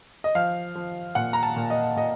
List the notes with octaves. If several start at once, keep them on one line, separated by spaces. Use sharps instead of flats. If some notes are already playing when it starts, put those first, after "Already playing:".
D#5
F3 F5
F3
A#2 F#5
A#5
A5
A#2
D#5
A#2 D#5